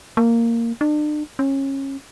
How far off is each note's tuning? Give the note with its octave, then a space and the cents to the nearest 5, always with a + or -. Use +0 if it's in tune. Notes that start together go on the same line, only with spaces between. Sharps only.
A#3 -10
D4 +40
C#4 -25